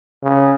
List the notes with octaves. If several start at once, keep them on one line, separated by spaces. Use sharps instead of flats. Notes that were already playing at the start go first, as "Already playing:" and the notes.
C#3